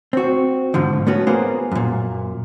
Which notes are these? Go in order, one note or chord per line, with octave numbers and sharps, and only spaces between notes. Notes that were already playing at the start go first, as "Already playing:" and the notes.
C4 F#4
G#2 B2 D3 F3
A3 B3 C#4 F#4
A#3 B3 F4 G#4 A#4 C5
F#2 A#2